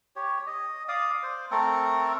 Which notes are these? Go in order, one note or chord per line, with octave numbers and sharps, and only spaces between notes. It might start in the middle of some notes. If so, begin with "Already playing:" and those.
G4 C#5
D#5
D5 F5 D#6
C5
A3 C4 A4 A#4